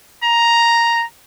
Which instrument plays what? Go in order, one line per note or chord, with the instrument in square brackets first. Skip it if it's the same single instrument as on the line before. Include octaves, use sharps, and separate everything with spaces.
[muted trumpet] A#5